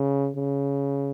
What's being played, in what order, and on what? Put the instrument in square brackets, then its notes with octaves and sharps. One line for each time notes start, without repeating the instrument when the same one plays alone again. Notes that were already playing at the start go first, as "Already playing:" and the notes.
Already playing: [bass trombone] C#3
C#3